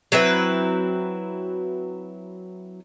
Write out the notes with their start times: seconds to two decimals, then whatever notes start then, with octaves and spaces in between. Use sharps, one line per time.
0.12 F#3 C4 E4 B4